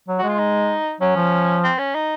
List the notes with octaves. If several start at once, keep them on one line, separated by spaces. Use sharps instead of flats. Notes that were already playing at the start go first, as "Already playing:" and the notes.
F#3
F#4
G#3
F4
D#4
F#3 C#4
F3
C4
C#4
D#4